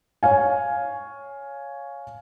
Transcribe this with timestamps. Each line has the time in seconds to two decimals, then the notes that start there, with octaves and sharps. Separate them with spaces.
0.23 C#5 F5 G#5